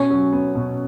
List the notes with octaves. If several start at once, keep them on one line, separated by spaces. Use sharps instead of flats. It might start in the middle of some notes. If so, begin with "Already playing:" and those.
Already playing: B2 C#4 C#5
F#3
B3
B2